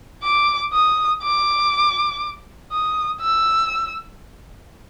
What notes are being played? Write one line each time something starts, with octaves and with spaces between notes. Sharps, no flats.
D6
D#6
D6
D#6
E6